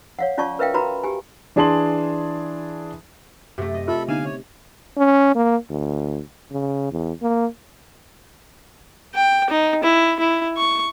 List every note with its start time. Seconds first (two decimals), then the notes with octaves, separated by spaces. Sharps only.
0.19 C#5 F5 F#5
0.38 C#4 F4 D5 A5 C#6
0.59 A#4 B4 E5 F5 G5
0.74 F#4 B4 A#5 B5
1.03 G4 G#5
1.56 E3 D4 G#4 A5 C6 F#7
3.58 F#2 C3 A3
3.74 D#5
3.88 F4 A4 E5 B5 F6
4.08 D3 B3 D#4 F5 G#5
4.25 C#5
4.97 C#4
5.35 A#3
5.70 D2
6.52 C#3
6.92 E2
7.22 A#3
9.15 G5
9.50 D#4
9.83 E4
10.20 E4
10.58 C#6